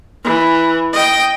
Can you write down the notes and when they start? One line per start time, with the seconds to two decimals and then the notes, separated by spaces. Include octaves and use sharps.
0.24 E3
0.93 D#5 G5